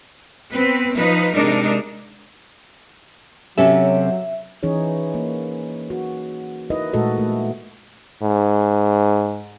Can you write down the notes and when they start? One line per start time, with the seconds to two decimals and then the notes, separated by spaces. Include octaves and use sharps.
0.52 B3 C4 B4
0.96 F3 D#4 B4
1.34 C3 G#3 D4 D#4 A#4
3.58 C3 F#3 C#4 A4 E5
4.63 E3 C#4 D#4 G#4 C#5
5.14 A#3
5.90 F#4
6.70 D#4 E4 A#4 B4 D#5
6.93 A#2 G#3 A3 F#4 A4 D#5
7.19 A3
8.23 G#2